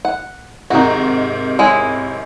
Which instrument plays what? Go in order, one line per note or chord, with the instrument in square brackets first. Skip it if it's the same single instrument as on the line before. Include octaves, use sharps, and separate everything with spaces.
[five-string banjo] F#5
[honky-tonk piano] G#2 C3 D#3 [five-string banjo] D#4 F#4
[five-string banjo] G#3 C#4 E4